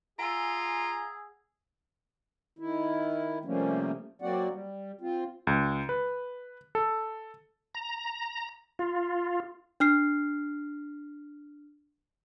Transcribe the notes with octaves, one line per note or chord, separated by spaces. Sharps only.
F4 G#4 F#5 G#5 A#5 E6
D#3 E4
C3 F3 G3 A3 A#3 C#4
F#3 A#3 C4 F#4 D5 F#5
G3
C4 F4
C#2
B4
A4
A#5
F4
D4 F6 C7